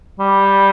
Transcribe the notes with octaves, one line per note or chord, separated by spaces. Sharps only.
G3